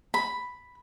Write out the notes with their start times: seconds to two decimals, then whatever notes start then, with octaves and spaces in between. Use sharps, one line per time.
0.14 B5